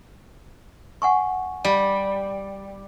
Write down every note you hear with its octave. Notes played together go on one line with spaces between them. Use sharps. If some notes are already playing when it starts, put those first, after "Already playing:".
F#5 G#5 C#6
G3 D5